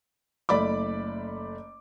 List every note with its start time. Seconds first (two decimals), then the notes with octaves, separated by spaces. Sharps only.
0.49 F#1 A3 D5 B5 D6